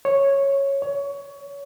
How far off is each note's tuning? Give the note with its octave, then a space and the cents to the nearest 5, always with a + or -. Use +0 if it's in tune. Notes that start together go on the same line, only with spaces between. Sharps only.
C#5 -5
C#5 +25